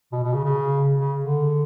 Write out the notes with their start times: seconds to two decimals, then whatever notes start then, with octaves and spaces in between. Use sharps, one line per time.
0.12 B2
0.23 B2
0.34 C#3
0.45 C#3
0.99 C#3
1.20 D3